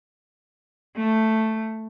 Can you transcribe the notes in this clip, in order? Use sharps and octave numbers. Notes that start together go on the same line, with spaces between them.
A3